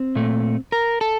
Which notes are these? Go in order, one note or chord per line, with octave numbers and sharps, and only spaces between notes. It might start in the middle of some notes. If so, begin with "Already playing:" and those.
Already playing: C4
A#2 A3
A#4
A4